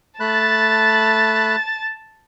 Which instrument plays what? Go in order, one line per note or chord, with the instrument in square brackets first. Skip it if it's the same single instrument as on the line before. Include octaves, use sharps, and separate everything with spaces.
[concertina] A3 B5 F#6 [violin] A5 A6